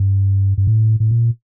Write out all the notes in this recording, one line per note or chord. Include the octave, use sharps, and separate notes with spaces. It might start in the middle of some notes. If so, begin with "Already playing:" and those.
Already playing: G2
G2
A2
A2
A#2